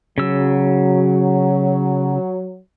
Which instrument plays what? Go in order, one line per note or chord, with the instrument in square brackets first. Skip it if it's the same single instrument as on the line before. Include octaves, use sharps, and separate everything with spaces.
[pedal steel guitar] C#3 E6 [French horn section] F#3